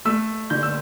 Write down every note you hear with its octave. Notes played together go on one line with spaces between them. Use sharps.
A3 E6
D3 G6
E6